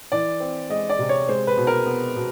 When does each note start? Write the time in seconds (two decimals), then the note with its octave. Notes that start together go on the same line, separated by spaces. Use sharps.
0.12 E3 D5
0.40 C4
0.70 G#3 D#5
0.89 D5
0.99 C3
1.09 C#5
1.28 G#3 C5
1.47 B4
1.57 B2
1.67 A#4
1.86 B3
2.16 B2